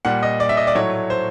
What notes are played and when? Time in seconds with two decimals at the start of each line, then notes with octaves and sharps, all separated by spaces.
0.05 A#2 G3 F#5
0.23 D#5
0.40 D5
0.49 E5
0.57 D#5
0.67 D5
0.75 A2 F#3 A3 C#5
1.10 C5